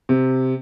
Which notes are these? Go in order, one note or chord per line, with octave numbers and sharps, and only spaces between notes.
C3